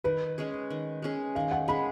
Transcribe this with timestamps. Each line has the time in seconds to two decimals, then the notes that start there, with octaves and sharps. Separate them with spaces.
0.04 D#3 B4
0.38 G#3 C#4 G#4
0.70 D#3
1.02 G#3 C#4 G#4
1.35 D#3 F5
1.51 F#5
1.68 G#3 C#4 G#4 B5